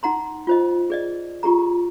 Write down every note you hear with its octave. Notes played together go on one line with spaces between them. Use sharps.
D#4 F#5 A#5 C6
F4 C5 D#5
G#4 D5 D#5
F4 G4 G#4 A#5